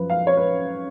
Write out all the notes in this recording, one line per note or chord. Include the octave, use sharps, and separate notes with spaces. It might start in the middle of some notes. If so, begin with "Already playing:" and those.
Already playing: F#2 F3 B4
F5
C#5
B4